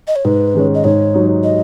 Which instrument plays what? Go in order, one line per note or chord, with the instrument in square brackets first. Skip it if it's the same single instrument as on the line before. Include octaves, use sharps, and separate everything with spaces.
[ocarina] D#5
C#5
[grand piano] G#2 [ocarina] B4
[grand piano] D#3 G#3 C#4
[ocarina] D#5
[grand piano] G#2 [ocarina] C#5
[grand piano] F#3 D#4
[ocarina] D#5